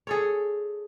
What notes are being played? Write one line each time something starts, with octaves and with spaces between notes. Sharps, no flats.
G#4 A4 C#5